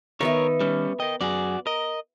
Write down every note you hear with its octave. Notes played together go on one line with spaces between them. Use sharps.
D#3 B3 D#4 A#4 B4 C#5 E5
G3 C#4
A#4 D#5 G5
F#2 F#4 G#4 D5
A#4 D#5 A#5